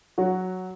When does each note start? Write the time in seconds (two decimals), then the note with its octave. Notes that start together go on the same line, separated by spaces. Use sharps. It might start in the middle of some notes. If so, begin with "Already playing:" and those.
0.18 F#3 F#4